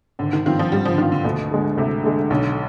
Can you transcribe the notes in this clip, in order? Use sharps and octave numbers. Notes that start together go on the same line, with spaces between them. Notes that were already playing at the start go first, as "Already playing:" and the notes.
G#1 D3
D#3
G2 D#3 F3 C4 F4
F3
G#1 G3
F3
D3
G2 D#3 F3 C4 F4
D3
D2 B2
D3 G#3
D2 C3
D3 G#3
B1 D3